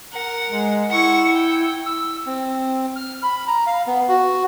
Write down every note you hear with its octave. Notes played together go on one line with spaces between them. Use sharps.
A#4 F#5
G#3
E4 F#5 C#6
G5
E6
C4
F6
B5
A#5
F5
B3
F#4